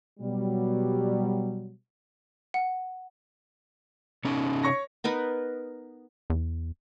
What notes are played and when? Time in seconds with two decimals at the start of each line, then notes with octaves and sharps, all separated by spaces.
0.20 B2 F#3 G3
2.54 F#5
4.25 C3 C#4 D#4
4.64 C#5 C#6 A#6
5.04 B3 D#4 A#4 B4
6.30 E2